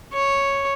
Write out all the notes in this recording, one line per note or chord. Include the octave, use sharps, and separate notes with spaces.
C#5